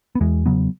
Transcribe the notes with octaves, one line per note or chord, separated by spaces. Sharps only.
B3
E2 E3 G#3
C#3 F#3 B3